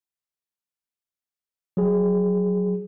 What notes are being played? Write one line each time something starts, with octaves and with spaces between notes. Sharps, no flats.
F#3 G#4